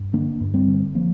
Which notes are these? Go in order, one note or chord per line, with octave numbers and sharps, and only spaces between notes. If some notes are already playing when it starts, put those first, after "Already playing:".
Already playing: G2
D3 A#3 D4
G2
G3 C4
D3
F3 A#3